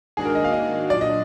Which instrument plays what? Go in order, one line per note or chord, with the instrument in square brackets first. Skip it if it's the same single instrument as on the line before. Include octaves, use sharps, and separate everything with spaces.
[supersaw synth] G#2 D#3 A#3 D4 F#4 [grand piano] G#4
[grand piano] A#4
D#5
F5
D#5
[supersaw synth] A#2 F#3 D4 F4 [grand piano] D5
[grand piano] D#5